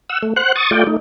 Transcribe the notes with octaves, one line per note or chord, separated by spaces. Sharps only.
F#5 E6
A3
C5 F#5 F#6
C#6 D#6 A6
A3 F4 D5 G5
A3 D#4